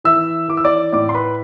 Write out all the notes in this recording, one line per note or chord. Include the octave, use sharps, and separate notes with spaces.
E3 E5 E6
E3 D6
E6
D5 D6
A2 D5 D6
C6
B4 B5